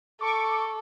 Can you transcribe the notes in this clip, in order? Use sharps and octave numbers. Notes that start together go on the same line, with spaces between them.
A4 C#6 D6